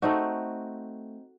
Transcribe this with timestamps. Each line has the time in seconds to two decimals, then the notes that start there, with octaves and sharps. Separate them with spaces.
0.02 A3 C4 D#4 F#4